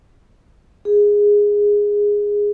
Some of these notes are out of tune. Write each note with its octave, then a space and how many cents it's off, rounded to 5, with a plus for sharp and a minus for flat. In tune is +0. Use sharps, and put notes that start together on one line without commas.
G#4 -10